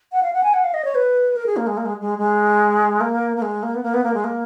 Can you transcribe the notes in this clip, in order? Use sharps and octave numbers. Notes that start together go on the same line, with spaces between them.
F#5
F5
F#5
G#5
F#5
F5
D#5
C#5
B4
A#4
G#4
A#3
G#3
A#3
G#3
G#3
G#3
A#3
A#3
G#3
A#3
B3
A#3
B3
A#3
G#3
A#3